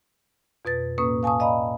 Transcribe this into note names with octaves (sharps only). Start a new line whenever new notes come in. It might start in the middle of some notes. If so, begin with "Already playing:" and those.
F2 B2 B4 A6
A2 A#3 C#4 B4 C#6 D#6
F5 G#5 A5 C#6 D#6
D5 D#5 F5 A#5 B5